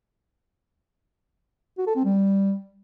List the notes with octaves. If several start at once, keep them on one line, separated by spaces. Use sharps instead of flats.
F#4
A4
C4
G3